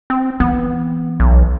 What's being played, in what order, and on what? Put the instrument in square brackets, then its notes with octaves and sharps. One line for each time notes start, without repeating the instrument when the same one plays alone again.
[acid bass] C4
[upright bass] E3 [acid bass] B3
[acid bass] B1